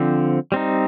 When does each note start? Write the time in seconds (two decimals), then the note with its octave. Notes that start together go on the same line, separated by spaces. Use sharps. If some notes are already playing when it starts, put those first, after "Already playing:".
Already playing: D3 F3 C4
0.52 G3 C4 D#4